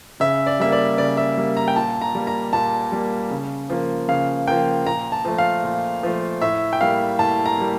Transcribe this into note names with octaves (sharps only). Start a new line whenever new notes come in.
C#3 E5
D5
G3 A#3 E5
D5
C#3 D5
E5
G3 A#3
A#5
G5
A#2 A5
A#5
G3 A#3
A#5
A#2 A5
G3 A#3
C#3
F3 A#3
C#3 F5
F3 A#3 G5
A#2 A#5
A5
F3 A3
F5
A#2
F3 A3
A2 E5
G5
G3 A#3 F5
A2 A5
A#5
G3 A#3